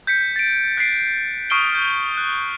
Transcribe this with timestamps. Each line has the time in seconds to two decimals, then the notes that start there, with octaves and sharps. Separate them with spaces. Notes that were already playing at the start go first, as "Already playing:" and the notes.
0.07 G6 B6 C#7
0.36 A6 D7
0.77 F#6 A6 B6 C7 D7
1.50 C#6 D#6 F6 C7 D7 G7
1.73 F6 G6
2.18 F#6